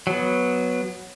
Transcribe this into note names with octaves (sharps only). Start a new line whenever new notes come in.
F#3 B3